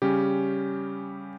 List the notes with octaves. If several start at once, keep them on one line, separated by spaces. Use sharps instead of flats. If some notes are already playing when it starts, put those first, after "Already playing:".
C#3 G3 C#4 G4